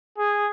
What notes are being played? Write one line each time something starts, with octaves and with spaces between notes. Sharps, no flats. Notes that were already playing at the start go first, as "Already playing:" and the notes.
G#4